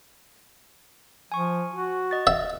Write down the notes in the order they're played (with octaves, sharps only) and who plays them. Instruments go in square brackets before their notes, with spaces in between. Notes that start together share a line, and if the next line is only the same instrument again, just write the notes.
[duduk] F3 [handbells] G#5 C#6
[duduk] F#4
[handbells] D#5 A6
[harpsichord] E5